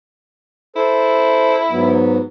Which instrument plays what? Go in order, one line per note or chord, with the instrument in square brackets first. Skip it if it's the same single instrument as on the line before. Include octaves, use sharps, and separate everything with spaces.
[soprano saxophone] E4 [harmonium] A4 C5
[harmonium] G#2 F#3 B3